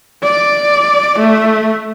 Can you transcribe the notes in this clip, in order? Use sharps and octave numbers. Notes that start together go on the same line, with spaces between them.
D5
A3